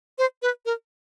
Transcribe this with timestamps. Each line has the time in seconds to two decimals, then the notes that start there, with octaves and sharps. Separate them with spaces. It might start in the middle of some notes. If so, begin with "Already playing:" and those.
0.18 C5
0.42 B4
0.66 A#4